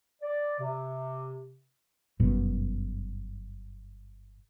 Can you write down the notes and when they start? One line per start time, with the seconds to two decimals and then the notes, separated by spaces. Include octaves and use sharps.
0.22 D5
0.60 C3
2.20 G1 F#2 B2